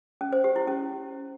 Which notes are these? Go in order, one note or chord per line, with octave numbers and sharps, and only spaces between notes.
C#4
C5
G4
E4
C#4